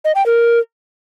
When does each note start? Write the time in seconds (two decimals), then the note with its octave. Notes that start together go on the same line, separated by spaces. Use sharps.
0.05 D#5
0.15 G5
0.26 A#4